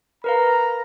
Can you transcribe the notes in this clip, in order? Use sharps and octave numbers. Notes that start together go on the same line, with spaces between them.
A#4 B4 F5 A#5